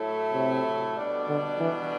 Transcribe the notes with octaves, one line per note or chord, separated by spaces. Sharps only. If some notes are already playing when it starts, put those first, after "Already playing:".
Already playing: A2 F#3 A3 E4 A4
C3
B2 G3 D4 A4 D5
D3
E3